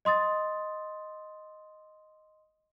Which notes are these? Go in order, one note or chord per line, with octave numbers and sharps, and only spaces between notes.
D#5 C6 D#6 A6